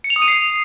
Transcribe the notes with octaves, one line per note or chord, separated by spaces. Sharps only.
C#7
F7
D#6
D#7
C7